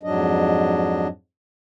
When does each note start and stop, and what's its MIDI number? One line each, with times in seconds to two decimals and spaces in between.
0.03 1.07 41
0.03 1.07 44
0.03 1.07 54
0.03 1.07 62
0.03 1.07 75